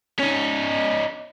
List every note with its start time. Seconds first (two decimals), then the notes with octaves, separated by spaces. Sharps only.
0.20 C#4 D#4